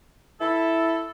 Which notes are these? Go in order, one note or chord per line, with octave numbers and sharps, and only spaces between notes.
E4 A4